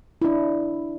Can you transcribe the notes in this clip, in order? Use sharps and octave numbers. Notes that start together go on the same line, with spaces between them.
D4 E4